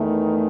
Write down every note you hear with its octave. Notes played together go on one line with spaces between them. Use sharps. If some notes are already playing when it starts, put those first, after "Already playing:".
Already playing: E2 D#3 A3